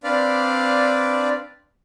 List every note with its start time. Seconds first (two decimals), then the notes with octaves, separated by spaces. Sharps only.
0.04 C4 D4 B4 D5 F5